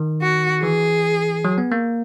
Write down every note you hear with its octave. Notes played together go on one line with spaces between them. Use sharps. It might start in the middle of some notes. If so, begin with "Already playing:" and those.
Already playing: D#3
F#4
E3 G#4
F#3
B3
A#3